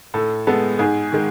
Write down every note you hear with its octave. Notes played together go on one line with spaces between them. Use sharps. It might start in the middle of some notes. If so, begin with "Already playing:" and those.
A2 A4
G#3 B3 A4
G#2 G#4
D#3 G#3